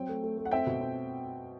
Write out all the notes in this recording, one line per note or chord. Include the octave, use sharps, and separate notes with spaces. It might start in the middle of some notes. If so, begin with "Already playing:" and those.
Already playing: F#3 C4 G5
A3
A3
A3
F#5
C4 E5 G5
B2
C4